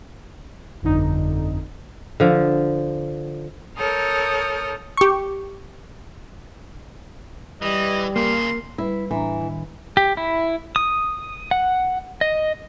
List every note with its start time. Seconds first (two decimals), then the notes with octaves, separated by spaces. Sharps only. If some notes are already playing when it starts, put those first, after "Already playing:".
0.83 G1 F2 D3 D#4
2.20 D3 F3
3.77 A4 A#4 C#5 D#6 F6 G6
4.97 G4 C#6
7.62 E3 G3 D#5
8.16 C#3 A#3 A#4 C6
8.78 G3 E4 B4
9.11 A2 E3 D4 A#5
9.41 D#3
9.97 G4
10.17 E4
10.76 D#6
11.51 F#5
12.21 D#5